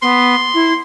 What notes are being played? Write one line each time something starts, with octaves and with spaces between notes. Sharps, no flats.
B3 C6
E4